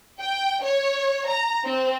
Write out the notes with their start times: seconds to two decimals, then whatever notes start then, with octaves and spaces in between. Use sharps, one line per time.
0.20 G5
0.64 C#5
1.29 A#5
1.65 C4